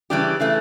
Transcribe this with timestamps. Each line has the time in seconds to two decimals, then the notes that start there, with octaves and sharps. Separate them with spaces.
0.10 C#3 E3 G3 D4 G4
0.40 C#3 E3 A3